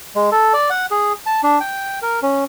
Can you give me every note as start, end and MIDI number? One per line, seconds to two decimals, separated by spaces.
0.15 0.30 56
0.32 0.53 69
0.53 0.70 74
0.70 0.86 78
0.91 1.13 68
1.26 1.41 81
1.43 1.59 62
1.60 1.99 79
2.02 2.20 70
2.22 2.44 61